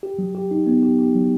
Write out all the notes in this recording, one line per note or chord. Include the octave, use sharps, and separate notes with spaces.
G4
F#3
G4
D#4
B3
G4
G4
F#3